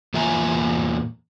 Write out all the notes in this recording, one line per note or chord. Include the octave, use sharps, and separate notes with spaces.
E2 A#2 F4 E5 G#5 A#5